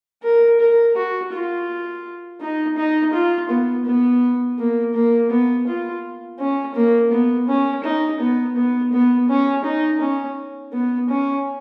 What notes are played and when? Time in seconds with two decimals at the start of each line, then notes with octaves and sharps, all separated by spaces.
0.23 A#4
0.60 A#4
0.96 F#4
1.32 F4
2.41 D#4
2.77 D#4
3.13 F4
3.50 B3
3.85 B3
4.58 A#3
4.94 A#3
5.30 B3
5.67 F4
6.39 C#4
6.75 A#3
7.11 B3
7.48 C#4
7.84 D#4
8.20 B3
8.56 B3
8.92 B3
9.29 C#4
9.64 D#4
10.01 C#4
10.73 B3
11.09 C#4